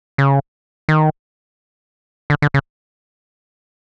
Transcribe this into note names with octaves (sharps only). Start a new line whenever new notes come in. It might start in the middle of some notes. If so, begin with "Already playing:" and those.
C#3
D#3
D3
D3
C#3